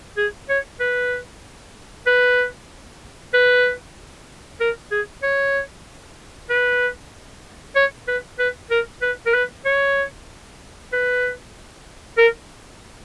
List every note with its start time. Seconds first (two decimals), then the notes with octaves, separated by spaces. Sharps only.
0.17 G#4
0.49 C#5
0.80 B4
2.06 B4
3.34 B4
4.60 A#4
4.91 G#4
5.23 C#5
6.50 B4
7.76 C#5
8.08 B4
8.39 B4
8.70 A#4
9.02 B4
9.26 A#4
9.34 B4
9.65 C#5
10.92 B4
12.18 A#4